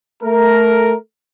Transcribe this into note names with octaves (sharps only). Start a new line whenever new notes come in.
A3 A#4